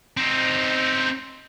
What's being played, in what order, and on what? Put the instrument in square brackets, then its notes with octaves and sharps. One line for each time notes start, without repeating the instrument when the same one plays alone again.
[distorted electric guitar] C4 D#4